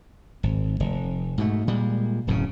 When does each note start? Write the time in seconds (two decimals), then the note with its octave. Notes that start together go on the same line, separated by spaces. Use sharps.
0.43 G#1
0.80 F1
1.38 G#2 B2 A3
1.68 A#2 G3 G#3
2.27 D1 F#2 A2 C#3